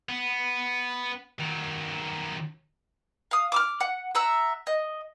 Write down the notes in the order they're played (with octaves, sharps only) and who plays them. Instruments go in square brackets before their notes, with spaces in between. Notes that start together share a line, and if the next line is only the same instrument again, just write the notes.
[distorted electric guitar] B3
D#3 F#3
[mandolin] F5 D#6
D6 E6 F6
F#5
E5 F#5 A#5 E6
D#5